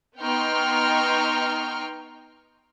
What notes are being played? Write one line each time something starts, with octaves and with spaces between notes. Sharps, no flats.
B3 D#4 G5 C6 C#6 F6